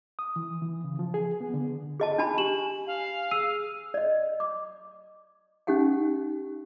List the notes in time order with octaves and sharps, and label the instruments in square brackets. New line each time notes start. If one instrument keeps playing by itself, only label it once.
[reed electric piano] D#6
E3
E3
C#3
F3
G#4
B3
D3
[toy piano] G#4 D#5 A5
[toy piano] D4 A5 B5 [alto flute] G#5
[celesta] G4 E7 F#7
[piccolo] F5
[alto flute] G#4 [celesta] E6 C7 D#7
[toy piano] D5 D#5
D6
C#4 D#4 G4 F#5 G5